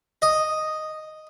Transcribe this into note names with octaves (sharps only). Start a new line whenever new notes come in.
D#5